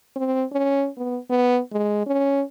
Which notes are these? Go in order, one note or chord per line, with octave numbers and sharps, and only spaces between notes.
C4
C#4
B3
B3
G#3
C#4